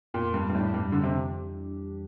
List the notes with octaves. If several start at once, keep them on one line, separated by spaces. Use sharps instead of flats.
F2 A#2
G2
G2
A2 E3 G3 D4 G4
G2
F2 D3
C3